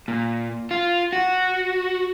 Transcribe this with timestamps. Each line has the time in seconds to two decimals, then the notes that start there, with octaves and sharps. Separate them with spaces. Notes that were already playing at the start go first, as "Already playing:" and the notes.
0.08 A#2
0.71 F4
1.13 F#4